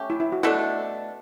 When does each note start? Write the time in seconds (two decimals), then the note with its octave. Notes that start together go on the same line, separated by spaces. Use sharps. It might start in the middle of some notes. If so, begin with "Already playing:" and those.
Already playing: A3 C#4 G4
0.10 E4
0.20 E4
0.32 F#4
0.43 B2 A3 D4 E4